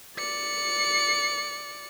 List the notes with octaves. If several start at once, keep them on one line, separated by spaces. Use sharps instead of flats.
D5 C#7